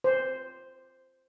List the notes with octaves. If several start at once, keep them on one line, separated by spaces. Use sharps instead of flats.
C5